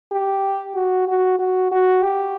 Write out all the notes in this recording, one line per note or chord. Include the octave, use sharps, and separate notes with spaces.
G4
F#4
F#4
F#4
F#4
G4